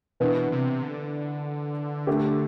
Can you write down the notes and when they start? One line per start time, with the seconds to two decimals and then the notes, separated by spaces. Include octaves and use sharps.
0.20 B2 E3 B3 D4
0.52 C3
0.83 D3
2.07 A3 D4 G4